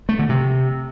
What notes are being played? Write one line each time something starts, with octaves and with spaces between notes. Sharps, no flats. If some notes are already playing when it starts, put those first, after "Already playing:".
A3
D3
C3